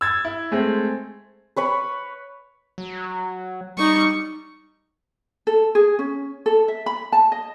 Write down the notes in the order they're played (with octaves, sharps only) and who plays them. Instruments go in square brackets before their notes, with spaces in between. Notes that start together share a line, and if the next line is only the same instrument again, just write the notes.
[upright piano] E6 G#6 A6
E4
G#3 A3 C4
[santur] B4 C#5 B5
[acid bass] F#3
[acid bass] G3 [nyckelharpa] D#4 C#6
[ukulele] A4
G#4
C#4
A4
E5
B5
A5
D#5